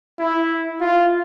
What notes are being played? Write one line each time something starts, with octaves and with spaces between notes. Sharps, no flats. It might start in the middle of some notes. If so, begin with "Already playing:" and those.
E4
F4